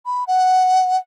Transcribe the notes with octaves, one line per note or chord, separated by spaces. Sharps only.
B5
F#5